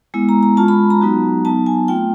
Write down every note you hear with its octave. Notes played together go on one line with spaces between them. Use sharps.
G#3 B3 E4
A#5
A#5
G#3 C#4 F4 A5
B5
A#5
F#3 B3 D#4 F#4
F#3 B3 D#4 A5
G#5
A3 C4 F4 G5